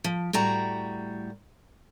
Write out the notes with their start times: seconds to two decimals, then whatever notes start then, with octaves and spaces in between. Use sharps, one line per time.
0.04 F3
0.33 A2 G3 F#4 A#5